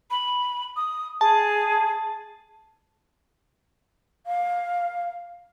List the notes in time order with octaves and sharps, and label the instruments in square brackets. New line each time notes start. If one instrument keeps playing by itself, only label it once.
[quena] B5
D#6
[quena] G#4 [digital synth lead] A5
[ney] F5